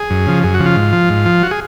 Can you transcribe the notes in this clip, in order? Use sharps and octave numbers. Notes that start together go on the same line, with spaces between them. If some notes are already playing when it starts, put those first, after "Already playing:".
Already playing: G#4
F#2
C#3 F3
F#2 G#4
F#4
C#3 F3
F4
G#2
F3
G#2
F3
F#4
G#4